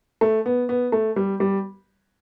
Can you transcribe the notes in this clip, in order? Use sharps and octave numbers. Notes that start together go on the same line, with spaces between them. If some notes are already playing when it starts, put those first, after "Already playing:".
A3
B3
B3
A3
G3
G3